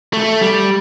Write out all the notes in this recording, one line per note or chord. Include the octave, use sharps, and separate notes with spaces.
A3
G3